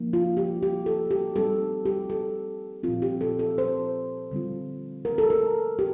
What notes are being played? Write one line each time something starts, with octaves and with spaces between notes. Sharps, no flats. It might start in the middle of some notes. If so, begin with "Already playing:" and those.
Already playing: F3 A#3 D#4
F4
G4
G4
A4
G4
G3 C4 D#4 A4
G4
A4
A#2 F3 C4 F4
G4
A4
A4
C5
D3 G3 C4 F4
A#4
A4
A#4
G4